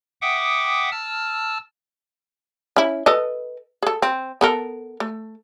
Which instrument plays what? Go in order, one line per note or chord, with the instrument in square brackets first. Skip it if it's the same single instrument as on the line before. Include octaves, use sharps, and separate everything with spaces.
[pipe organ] E5 F#5 G5 D6 D#6
A5 E6 F6
[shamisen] C#4 E4
A4 B4 D#5
G#4 A4
C4
B3 A4 A#4
A3